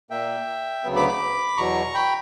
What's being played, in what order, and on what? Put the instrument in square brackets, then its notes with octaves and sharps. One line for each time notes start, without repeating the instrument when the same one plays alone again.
[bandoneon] A#2 A#3 E5 G5
D2 C#3 F#3 B3
B5 D6
B5 D6
E2 B2 F#3 A#5 C#6
G5 B5